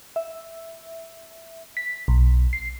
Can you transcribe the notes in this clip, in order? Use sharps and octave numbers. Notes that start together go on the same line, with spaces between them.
E5
B6
B1
C7